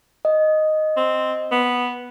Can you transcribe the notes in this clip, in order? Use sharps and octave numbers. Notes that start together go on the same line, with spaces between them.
D#5
C4
B3